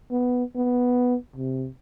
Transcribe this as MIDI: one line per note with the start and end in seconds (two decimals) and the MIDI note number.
0.11 0.44 59
0.56 1.15 59
1.36 1.68 48